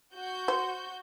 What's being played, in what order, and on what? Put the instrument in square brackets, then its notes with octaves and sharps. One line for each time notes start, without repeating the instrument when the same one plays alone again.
[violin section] F#4 G6
[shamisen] C5